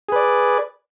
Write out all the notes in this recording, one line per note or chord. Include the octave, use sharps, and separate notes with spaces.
G#4 B4 D5